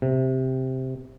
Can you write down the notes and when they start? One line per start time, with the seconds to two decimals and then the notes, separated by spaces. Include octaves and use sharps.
0.02 C3